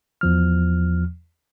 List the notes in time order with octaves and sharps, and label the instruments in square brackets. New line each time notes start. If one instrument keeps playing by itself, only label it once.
[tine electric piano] E2 F3 F6